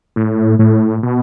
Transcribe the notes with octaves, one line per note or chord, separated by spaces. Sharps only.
A2
A2
B2